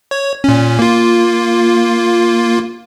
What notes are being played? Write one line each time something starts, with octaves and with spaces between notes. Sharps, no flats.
C#5
A#2 C#4
A#3 F4